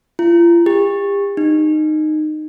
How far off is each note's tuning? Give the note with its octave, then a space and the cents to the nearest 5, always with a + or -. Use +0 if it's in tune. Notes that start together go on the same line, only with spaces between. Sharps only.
F4 -40
G4 +40
D#4 -15